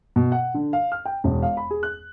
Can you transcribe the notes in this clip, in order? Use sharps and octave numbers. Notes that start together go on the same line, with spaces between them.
B2
F#5
D3
F5
F6
G5
E1
F5
B5
G#4
F#6